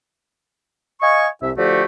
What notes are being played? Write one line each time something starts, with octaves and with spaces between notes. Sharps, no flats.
D#5 F5 G#5 C#6
C2 E5
D3 F3 A3 F#4 G4